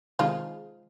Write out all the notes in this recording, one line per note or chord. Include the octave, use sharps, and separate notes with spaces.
C3 D#3 F3 G#3 D#4 F4 G#4